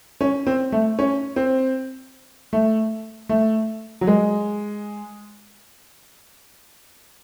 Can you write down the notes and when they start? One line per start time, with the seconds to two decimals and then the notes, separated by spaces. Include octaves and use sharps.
0.21 C#4
0.47 C4
0.72 A3
0.99 C#4
1.36 C4
2.53 A3
3.29 A3
4.01 F#3
4.07 G#3